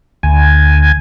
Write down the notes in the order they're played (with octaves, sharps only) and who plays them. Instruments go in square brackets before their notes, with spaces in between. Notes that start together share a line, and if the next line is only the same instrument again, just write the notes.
[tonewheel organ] D2 G#5